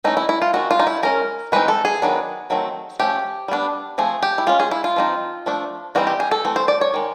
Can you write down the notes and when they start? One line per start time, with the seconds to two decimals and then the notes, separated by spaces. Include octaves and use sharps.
0.04 E3 A3 C#4 D#4
0.17 E4
0.29 E4
0.42 F4
0.53 D#3 G#3 C4 F#4
0.71 F4
0.79 D#4
0.87 E4
1.03 G#3 C#4 A#4
1.52 E3 G#3 C4 D#4 B4
1.68 A4
1.85 G#4
2.02 D#3 F#3 B3 D4
2.50 D#3 F#3 A3 C4
3.00 F3 A3 C#4 G4
3.48 G3 B3 D4
3.98 F3 A3 C4 G#4
4.23 G4
4.38 E4
4.47 G#3 C#4 F4
4.60 G#4
4.71 E4
4.84 F4
4.96 F3 A3 C4 D#4
5.46 F3 A3 D4
5.95 E3 G3 C4 D#4 F#4
6.07 G4
6.20 G#4
6.31 A4
6.45 E3 A3 C4
6.56 C5
6.68 D5
6.81 C#5
6.94 D#3 G#3